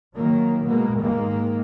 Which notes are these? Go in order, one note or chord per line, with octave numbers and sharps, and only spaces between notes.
D#3 F#3 A#3
B2 G#3 A#3
G#2 D#3 G#3 A#3